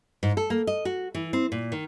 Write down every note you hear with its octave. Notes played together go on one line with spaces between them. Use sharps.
G#2
A4
A#3
D#5
F#4
E3
C4
A#2
D#3